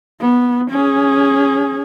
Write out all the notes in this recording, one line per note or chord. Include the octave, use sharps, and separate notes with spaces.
B3
C#4 G#4